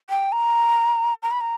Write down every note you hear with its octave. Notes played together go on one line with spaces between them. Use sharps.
G5
A#5
A#5
B5
A#5